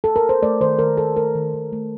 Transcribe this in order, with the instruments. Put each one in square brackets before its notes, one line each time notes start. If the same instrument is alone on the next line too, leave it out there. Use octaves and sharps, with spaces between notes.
[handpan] A4
A#4
C5
A3 D5
D#3 C5
D#3 A#4
A3 A4
A3 A#4
D#3
D#3
A3